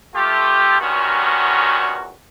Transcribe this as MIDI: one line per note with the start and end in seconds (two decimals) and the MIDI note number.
0.14 0.76 57
0.14 0.76 65
0.14 0.76 67
0.80 2.13 40
0.80 2.13 43
0.80 2.13 46
0.80 2.13 51
0.80 2.13 61
0.80 2.13 66